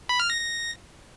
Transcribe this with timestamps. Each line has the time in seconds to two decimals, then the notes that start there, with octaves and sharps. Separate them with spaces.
0.09 B5
0.20 F6
0.30 A#6
0.40 A#6